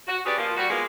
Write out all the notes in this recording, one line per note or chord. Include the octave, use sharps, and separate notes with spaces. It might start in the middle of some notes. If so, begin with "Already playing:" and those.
F#4
C#4 G4 G#4 B4 D5
F3 A#3
G3 F#4
G#3 A#3 B3 F4